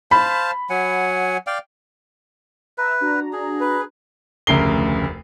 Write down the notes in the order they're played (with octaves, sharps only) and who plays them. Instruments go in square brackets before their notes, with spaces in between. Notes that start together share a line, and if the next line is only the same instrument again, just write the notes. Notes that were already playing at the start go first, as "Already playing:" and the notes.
[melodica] C5 F5 A5 [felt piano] B5
[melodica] F#3 F#5 G#5
D5 F5 G5
[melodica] B4 [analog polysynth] E5 A#5
[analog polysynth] D4 F#4 A#5
[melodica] G#4
[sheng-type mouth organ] B4
[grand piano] F1 D2 C#3 A#4 C7 G7